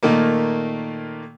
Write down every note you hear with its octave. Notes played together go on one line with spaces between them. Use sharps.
A#2 D#3 A3 A#3